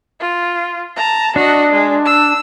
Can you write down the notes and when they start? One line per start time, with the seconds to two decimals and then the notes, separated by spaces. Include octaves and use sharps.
0.20 F4
0.96 A5 A#5
1.36 D4 F#4 D#5
1.72 G#3
2.05 E6